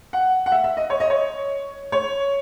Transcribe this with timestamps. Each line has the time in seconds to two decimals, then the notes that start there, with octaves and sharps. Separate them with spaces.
0.13 F#5
0.46 F#5
0.52 E5
0.64 E5
0.77 D#5
0.90 C#5
1.00 D#5
1.10 C#5
1.92 C#5